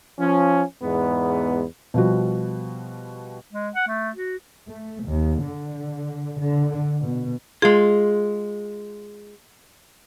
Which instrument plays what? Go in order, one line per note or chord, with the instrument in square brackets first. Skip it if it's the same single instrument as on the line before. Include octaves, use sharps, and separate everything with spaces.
[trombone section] F3 C#4
E2 G#2 B3
[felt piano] B2 F3 G3 F#4
[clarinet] G#3
F#5
A3
F#4
[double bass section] A3
D#2
D3
D3
B2
[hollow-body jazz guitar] G#3 F4 [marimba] G#4